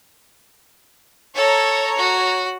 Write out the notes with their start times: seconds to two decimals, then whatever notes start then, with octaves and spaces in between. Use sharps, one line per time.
1.35 A4 C#5 A#5
1.98 F#4